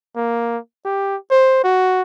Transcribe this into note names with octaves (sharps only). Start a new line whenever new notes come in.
A#3
G4
C5
F#4